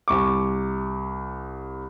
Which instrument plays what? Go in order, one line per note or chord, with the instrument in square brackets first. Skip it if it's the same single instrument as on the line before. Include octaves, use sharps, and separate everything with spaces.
[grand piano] C2 C#6 D6